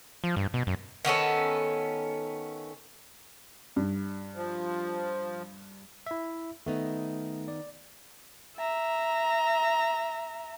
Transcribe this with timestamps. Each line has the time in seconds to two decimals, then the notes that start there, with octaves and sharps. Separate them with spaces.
0.24 F3
0.36 G2
0.54 B2
0.67 F#2
1.05 D#3 B3 C#4 A4
3.76 G2
4.36 F3
6.06 E4 E5
6.66 D#3 A3 B3 D#4
7.48 D5
8.57 E5 A#5